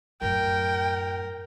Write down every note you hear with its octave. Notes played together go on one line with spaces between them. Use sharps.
F#2 A2 A#4 G5